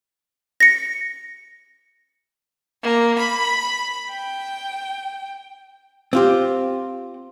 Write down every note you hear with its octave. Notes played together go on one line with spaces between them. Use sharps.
A#6 C#7
A#3
B5
G5
C4 F4 G4